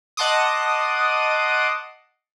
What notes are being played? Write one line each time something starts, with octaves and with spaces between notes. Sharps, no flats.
D#5 F#5 A5 C6 D6 D#6